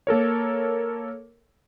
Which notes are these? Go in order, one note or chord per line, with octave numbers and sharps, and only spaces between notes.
A#3 A4 A#4 C#5